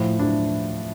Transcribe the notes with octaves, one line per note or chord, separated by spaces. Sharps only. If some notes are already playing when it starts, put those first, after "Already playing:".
Already playing: A2 F3
D4 E4